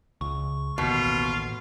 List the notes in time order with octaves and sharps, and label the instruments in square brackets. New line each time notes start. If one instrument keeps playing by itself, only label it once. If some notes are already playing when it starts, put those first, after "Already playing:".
[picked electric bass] C#2 [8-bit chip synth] C#6
[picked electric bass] A1 D#2 [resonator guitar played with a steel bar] B2 [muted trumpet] F4